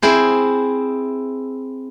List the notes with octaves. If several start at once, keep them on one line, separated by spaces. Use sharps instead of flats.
C4 E4 G#4 C5